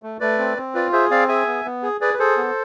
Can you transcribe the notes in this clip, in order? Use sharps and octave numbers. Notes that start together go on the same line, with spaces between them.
A3
A3 B4 D5
C4
C4
F4 B4 D5
G#4 C5 E5
C4 D5 F5
G#4 E5 G#5
B3
B3
G#4
G#4 B4 D5
B4
G#4 A4 C5
B3